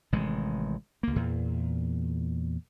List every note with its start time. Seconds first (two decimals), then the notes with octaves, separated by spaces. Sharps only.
0.13 A1 C3 D#3 G#3
1.03 C#2 A#3
1.16 E2 A#2